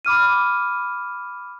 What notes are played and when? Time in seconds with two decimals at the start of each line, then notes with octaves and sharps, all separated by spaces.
0.05 B5 D6 F6 D#7